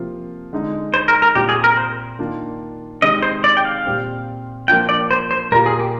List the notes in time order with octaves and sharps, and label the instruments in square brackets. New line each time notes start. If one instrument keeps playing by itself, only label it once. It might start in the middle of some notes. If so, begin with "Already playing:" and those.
Already playing: [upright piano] C3 F3 A#3 F4
D3 G#3 D#4
[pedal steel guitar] C5
A#4
A#4
[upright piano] A#2 G3 C4 F4 [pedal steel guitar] G4
[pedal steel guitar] G#4
A#4
C5
[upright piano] D#3 A#3 D4 F4
[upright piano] C3 D#3 G#3 [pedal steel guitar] D#5
[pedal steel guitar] C5
D5
G5
F5
[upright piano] A#2 G3 C4
[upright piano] F3 A#3 D4 F4 [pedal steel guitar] G5
[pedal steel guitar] D5
C5
C5
[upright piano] A#2 G3 A#3 F4 [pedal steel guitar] A#4
[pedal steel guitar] G#4
G4